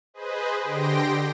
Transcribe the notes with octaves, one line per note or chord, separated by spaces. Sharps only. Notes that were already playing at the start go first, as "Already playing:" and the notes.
G#4 B4 C5 D#5
D3 G4 G5 C6 A#6 D7